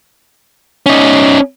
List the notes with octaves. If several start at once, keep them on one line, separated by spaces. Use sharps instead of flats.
C#4 D#4